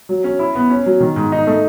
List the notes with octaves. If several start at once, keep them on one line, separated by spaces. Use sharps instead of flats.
F#3
C#4
E4
B3
C#4
F#3
D#3
G#2
D#4
A3